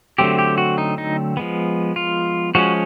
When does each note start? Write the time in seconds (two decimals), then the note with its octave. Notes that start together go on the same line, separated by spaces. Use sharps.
0.18 D3 F#3 A3 C4 G4
0.39 G4
0.58 F#4
0.78 D#4
0.98 D#4
1.37 F3 G#3 B3
1.96 F4
2.55 F3 G#3 C#4 F#4